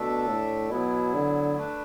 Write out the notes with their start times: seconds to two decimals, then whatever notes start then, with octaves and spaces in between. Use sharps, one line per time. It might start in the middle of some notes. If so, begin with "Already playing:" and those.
Already playing: B2 A3 D4 A4 E5
0.28 A2
0.70 B2 F#3 B3 E4
1.14 D3
1.56 A3 D4 B4